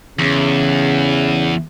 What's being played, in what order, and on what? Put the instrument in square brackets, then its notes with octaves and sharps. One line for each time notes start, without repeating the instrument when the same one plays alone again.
[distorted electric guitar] E2 [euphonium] C#3